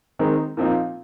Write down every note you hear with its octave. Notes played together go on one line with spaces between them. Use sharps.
D#3 G#3 C4 D#4
A#2 F3 C4 D#4